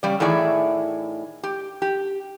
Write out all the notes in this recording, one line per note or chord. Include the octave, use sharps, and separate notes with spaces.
C#3 G3 D5
A2 D#3 E3 G#4 D5 E5
G4
G4